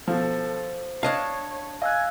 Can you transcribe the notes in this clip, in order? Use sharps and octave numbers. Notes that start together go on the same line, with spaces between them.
B2 F3 A4 C5
D4 C#5 D#5 F5 A5 G#6
D#5 F5 G#5 E6 F#6